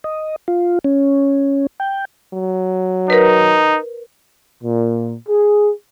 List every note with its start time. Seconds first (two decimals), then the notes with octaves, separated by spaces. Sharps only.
0.04 D#5
0.48 F4
0.84 C#4
1.80 G5
2.34 F#3
3.10 D#4 A#4 B4
4.64 A#2
5.29 G#4